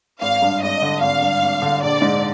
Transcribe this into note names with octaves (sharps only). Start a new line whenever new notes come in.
G#1 F5
G2
G#1 D#5
D3
G#1 F5
G2
G#1
D3
A#1 D5
G#2